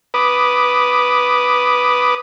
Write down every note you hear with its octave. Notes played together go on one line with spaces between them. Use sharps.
B4 B5 D6 D#6